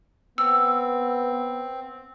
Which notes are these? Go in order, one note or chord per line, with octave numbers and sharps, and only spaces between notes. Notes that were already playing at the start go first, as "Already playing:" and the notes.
B3 C4 E6